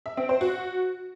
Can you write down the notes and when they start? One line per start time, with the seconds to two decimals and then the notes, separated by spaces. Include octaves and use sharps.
0.06 E5
0.17 C4
0.29 C5
0.41 F#4